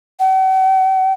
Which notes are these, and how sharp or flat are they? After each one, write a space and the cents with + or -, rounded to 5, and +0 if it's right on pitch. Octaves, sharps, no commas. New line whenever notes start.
F#5 +45